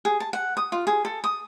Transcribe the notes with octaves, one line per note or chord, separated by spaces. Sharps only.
G#4
A5
F#5
D#6
F4
G#4
A4
D#6